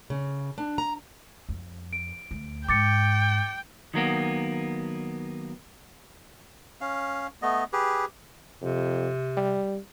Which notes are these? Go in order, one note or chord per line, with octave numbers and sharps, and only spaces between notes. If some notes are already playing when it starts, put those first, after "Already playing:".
C#3
D4
A#5
F2
D7
D2
G#2 G5 D6 A6 C#7
D#3 F#3 A#3 B3
C#4 F5
A3 B3 D#5
G4 G#4 B4
F2 C3
G3